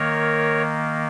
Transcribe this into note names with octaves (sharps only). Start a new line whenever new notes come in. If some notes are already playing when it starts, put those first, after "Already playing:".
Already playing: D#3 A#3 A#4 C#5